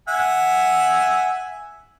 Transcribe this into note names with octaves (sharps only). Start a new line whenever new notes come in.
E5 F#5 G#5